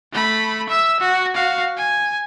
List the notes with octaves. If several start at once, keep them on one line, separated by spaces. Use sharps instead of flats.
A3 B5
E5 E6
F#4
F#4 F5
G#5